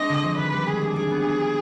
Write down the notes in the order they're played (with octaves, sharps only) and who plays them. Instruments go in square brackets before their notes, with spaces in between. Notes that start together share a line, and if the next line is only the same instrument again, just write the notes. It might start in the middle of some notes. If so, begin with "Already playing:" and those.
Already playing: [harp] G#3 C4 D4 [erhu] D#5
[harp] D3
F3
[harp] D#3 [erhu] B4
[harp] G3
[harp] G#3 [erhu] G#4
[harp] D4
[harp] G3 [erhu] G#4
[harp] B3
D4
G4